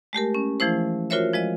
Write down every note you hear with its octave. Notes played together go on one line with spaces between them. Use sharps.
G#3 A3 G4 A#4
C#4
E3 F3 A3 E4 C5
F4 F#4 A#4 C5 C#5 E5
F3 G#3 D#5